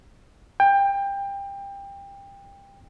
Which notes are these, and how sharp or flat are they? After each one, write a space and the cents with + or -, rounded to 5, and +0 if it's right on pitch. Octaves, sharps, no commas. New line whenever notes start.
G5 +25